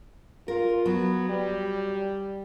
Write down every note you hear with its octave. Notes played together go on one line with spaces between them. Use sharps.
F4 A#4
F#3 B3
G3